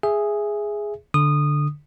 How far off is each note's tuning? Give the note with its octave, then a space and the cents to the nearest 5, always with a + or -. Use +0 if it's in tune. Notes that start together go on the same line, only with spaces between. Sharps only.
G#4 +0 E5 +10
D3 +0 D#6 -15